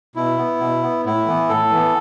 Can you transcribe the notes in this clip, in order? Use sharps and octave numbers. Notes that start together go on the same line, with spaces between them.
B2 E4
B3
B2
B3
A2 E4
E3 B3
A2 A4
E3 B3